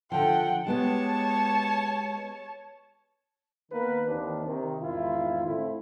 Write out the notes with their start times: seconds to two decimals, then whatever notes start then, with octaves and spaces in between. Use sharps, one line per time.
0.12 D3 F3 F#5 G5
0.67 G#3 B3 G4 C#5 A5
3.72 D#3 A#3 B3 A#4 B4
4.07 D#2 D#3 E3 A#3 C4 D4
4.46 C3 D#3
4.81 G#1 E2 D#3 E4 F4
5.46 A2 D3 C4 E4